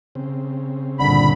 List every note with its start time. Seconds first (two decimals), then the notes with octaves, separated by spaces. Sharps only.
0.15 C#3 C4
0.99 G1 A#2 D3 B5